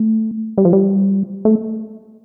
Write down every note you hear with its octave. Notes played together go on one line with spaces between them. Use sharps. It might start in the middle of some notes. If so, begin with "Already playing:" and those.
Already playing: A3
G3
F3
G3
A3